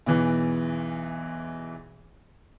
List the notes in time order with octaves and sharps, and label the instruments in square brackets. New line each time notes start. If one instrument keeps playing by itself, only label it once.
[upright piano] B1 E2 E3